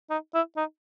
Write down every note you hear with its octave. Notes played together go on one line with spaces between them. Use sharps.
D#4
E4
D#4